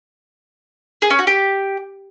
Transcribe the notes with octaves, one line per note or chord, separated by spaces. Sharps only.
G#4
C#4
F#4
G4